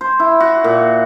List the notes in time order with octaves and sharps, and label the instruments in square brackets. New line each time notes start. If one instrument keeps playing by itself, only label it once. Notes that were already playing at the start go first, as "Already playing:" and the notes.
[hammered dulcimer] C5
E4
F#4
A#2